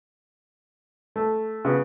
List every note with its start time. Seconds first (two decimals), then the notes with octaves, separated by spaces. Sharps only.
1.16 A3
1.65 C#3 B3